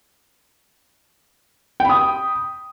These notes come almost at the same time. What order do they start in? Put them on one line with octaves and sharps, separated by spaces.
G5 B5 D#6